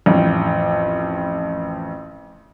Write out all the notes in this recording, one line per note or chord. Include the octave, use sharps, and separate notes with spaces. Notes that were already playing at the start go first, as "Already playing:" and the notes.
A1 F2